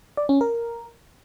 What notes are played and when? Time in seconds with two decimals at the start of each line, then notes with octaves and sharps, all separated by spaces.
0.17 D5
0.29 C#4
0.41 A#4